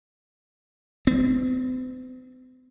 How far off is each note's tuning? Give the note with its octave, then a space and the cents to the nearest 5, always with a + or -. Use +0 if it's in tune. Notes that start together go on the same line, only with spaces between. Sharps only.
C4 -45